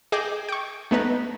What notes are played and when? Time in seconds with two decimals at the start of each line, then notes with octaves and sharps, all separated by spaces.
0.12 G#4 D#5 G5 D6 E7
0.49 G5 C#6
0.91 A3 B3 D#4 B4